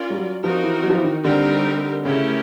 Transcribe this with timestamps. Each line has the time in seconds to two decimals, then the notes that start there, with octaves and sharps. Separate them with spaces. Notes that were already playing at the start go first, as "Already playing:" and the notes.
Already playing: C#4 F4 A#4 D5
0.10 G3
0.17 F#3
0.44 F3 C4 D#4 F#4 A#4
0.64 E3
0.83 F#3
0.90 F3
0.97 E3
1.04 D#3
1.25 D3 G3 C4 D#4 G4 A#4
2.05 C#3 A3 C#4 E4 G4 A#4